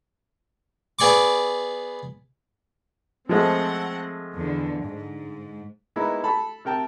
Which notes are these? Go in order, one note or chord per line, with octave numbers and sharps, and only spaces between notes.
B3 G#4 D5 C#6 D6
F3 G#3 A3 C4 F#5
E2 D3
G#2
G#3 A#3 B3 D#4 E4
A4 A5 B5
C3 A#4 G5 A5